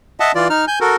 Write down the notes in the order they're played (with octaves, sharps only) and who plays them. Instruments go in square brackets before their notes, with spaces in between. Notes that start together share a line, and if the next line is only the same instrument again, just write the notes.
[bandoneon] D#5 E5 F#5 A5
E3 F4 D5
D#4 F6
G#5 G6
F#4 A4 A#4